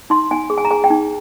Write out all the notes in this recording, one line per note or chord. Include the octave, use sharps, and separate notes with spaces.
D#4 C6
D#4 G#5
G#4
G#5
A#5
G#4 G#5
G5
D#4